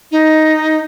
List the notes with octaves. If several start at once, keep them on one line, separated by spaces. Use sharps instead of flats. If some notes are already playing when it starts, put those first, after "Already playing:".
D#4